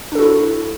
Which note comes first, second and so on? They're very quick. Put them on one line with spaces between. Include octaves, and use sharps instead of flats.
D4 A4 F#4 E4